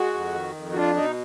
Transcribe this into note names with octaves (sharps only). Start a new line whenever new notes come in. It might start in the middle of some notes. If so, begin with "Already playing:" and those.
Already playing: G#3 F#4
F2
D#3
F2
F#4
D4 F4
B2 D#4